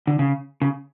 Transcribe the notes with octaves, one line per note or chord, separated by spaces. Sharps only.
D3
C#3
C#3